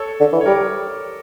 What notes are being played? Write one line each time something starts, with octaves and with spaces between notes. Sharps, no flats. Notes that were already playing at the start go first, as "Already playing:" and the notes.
Already playing: A4 C#5
D3
E3
C#5
G3 A#4 D5